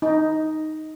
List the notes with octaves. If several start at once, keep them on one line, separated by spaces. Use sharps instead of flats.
D#4